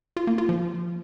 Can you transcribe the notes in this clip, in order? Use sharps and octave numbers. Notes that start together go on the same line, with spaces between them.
F4
A#3
F4
F3